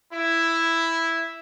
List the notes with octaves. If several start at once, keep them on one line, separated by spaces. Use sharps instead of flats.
E4